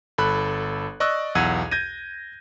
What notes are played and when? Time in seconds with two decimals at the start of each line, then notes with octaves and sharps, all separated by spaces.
0.18 G1 A4 B5 F#6
1.00 D5 D#5 C#6 E6 F#6
1.35 B1 E2 F#5 E6 G#6 D#7
1.71 G6 G#6 A#6 D#7